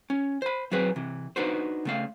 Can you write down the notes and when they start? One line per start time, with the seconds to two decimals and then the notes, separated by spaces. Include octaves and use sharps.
0.10 C#4
0.42 C5 B5
0.71 F#3 C4 F#4 G#4 B4 C5
0.96 C3 E3
1.36 D4 D#4 F#4 B4 C5
1.85 C#3 A3 F5